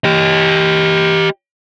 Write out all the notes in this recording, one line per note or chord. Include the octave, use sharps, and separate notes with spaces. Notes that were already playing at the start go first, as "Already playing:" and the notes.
G4 D#5